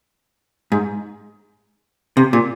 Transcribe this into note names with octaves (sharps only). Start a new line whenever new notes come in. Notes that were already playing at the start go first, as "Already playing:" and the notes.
G#2
C3
A#2